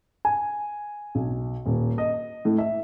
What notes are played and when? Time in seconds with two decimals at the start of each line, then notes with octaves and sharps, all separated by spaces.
0.25 G#5
1.15 B1
1.66 D#1
1.98 D#5
2.45 A2
2.58 E5